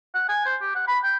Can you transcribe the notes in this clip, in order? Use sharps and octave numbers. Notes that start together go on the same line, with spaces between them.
F#5
G#5
C5
G4
F#5
B5
G5